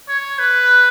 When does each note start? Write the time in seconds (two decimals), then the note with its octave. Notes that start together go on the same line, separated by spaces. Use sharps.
0.09 C#5
0.39 B4